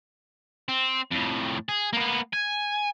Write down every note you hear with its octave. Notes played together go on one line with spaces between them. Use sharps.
C4
F2 A2
G#4
A#3 B3
G#5